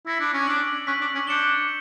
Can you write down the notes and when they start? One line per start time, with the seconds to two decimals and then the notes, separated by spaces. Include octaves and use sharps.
0.06 E4 E6 A#6 C#7
0.20 D4
0.34 C#4
0.47 D4 E6 B6 D7 F#7
0.87 C#4 C#6 F#6 B6 F#7
1.01 D4
1.15 C#4
1.27 D4 G6 C#7 E7 G7